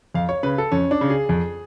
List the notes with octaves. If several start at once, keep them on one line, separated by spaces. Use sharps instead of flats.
F2 F5
C#5
C#3 B4
A4
F2 C#4
D4
C#3
G#4
F2